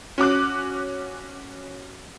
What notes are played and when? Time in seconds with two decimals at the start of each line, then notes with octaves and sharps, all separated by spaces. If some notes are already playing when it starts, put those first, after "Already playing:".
0.18 C#4 F#4 D6 F#6